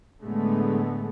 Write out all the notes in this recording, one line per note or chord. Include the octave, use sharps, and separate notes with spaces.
A2 D3 G#3 A3 B3